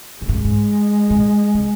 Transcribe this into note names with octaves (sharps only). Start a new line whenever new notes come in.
A#2 G#3
G#2
G2
G#2
A#2
C#3